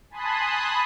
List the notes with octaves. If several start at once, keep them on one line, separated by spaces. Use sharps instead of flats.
G#5 A5 B5 C6 D#6 F#6